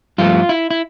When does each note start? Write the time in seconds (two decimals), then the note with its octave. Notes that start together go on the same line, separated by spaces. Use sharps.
0.18 G2 F3 A3 F4
0.49 E4
0.70 E4